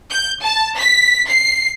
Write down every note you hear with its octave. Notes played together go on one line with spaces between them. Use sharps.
G6
A5
B6
C7